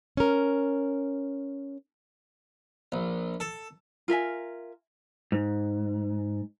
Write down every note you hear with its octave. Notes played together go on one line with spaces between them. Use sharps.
C#4 A#4
A#1
A4
F4 A#4 E5 G#5
G#2